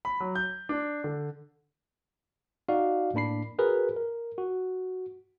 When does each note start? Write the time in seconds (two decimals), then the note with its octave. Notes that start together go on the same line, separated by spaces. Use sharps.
0.05 B5
0.20 F#3
0.35 G6
0.69 D4
1.04 D3
2.69 D#4 F#4 D5 F5
3.14 A2 A#3 D4 B5 C7
3.59 F#4 G#4 A#4 B4
3.97 A#4
4.38 F#4